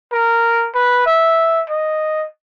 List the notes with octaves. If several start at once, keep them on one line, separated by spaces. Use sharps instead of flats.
A#4
B4
E5
D#5